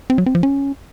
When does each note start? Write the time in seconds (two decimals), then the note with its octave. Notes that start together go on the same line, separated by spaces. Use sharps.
0.10 C4
0.18 F#3
0.26 C4
0.35 F3
0.43 C#4